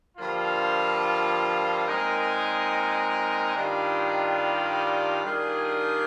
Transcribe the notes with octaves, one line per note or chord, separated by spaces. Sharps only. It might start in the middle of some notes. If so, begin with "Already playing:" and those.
G2 D3 F3 A#3 F4
A#2 G#3 C4 D#4 A#4
G2 D#3 G3 D4 F4
D#3 G3 D4 F4 G#4